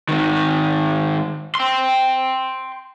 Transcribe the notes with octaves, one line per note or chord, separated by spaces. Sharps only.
G#2 D#3
G5 C6